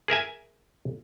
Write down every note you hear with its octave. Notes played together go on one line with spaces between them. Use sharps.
G#4 A#4 E5 G#5